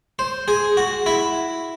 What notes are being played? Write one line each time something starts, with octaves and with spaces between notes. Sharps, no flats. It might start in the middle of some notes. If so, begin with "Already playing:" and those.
C5
G#4
F#4
E4